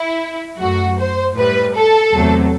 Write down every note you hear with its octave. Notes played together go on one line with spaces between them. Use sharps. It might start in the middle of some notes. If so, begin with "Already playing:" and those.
Already playing: E4
F#2 F#3 A3 F#4
C5
A2 G3 B4
A4
E2 C3 F#3 A3